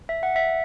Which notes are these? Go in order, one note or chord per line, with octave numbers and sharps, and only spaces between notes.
E5
F#5
E5